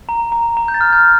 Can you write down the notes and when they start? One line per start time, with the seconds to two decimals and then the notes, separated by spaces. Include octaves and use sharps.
0.09 A#5
0.32 A#5
0.57 A#5
0.68 G6
0.74 A6
0.81 F6
0.93 G6